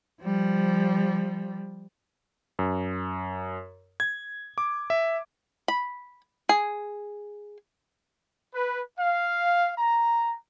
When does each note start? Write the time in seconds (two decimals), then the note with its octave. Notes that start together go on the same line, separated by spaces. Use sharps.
0.22 F3 G3
2.59 F#2
4.00 G#6
4.58 D6
4.90 E5
5.68 B5
6.49 G#4
8.52 B4
8.97 F5
9.77 A#5